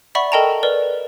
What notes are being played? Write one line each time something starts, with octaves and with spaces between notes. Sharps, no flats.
D5 E5 F#5 B5 C#6
A4 A#4 D#5 G5 A5 A#5
A#4 B4 D5